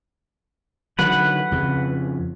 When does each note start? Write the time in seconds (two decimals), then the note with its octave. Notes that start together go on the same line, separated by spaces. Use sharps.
0.99 D3 D#3 F#3 B4 F#5
1.52 F2 C#3